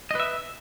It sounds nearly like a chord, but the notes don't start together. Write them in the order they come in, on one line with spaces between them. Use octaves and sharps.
D#5 B4 E5